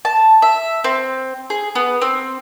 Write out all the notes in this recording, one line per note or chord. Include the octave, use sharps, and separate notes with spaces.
A5
E5
C4
G#4
B3
C4